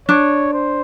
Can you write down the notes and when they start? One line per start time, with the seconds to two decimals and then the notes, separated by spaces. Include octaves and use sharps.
0.08 D4 C#5
0.53 C5